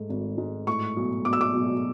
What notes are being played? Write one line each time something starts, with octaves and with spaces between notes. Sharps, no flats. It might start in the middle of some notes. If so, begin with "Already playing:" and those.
Already playing: G#2 A3
G#1
G#2
A2 C#6
B1
B1 D6
E6
D6
B1